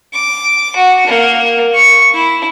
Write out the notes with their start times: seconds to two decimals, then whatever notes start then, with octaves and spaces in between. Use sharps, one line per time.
0.13 D6
0.76 F#4
1.07 A#3
1.74 C#6
2.14 E4